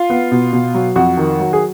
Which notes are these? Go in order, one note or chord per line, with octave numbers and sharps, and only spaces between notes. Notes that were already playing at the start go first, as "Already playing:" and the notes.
Already playing: F4
B3
B2
B2
F#3
F2 F#4
D#3
F#3
G#4